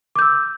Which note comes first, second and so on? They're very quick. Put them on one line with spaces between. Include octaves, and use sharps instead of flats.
D6 G6 E6